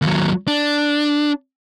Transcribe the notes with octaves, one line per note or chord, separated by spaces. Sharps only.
D#2 F#3
D4